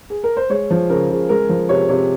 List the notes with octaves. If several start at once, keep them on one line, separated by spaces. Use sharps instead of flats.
G#4
A#4
C5
G#3 C#5
F3
C#3 A#4
C#3
G#3 A#4
F3
C3 C#5
C3 C#5